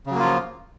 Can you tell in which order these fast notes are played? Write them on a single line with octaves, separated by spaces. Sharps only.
C#3 F#3 A#3 F4 F3